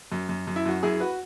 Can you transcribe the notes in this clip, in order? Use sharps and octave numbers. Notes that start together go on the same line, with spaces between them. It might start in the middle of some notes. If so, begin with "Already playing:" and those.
F#2
F#2
F#2
E4
F#2 F#4
F#2 E4 G#4
F#4 B4